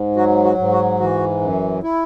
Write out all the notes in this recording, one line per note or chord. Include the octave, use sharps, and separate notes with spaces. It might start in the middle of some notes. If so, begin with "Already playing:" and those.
Already playing: G#2
F#3 F#4
F#4
G#2
F#4
E3 F#4
F#2
E4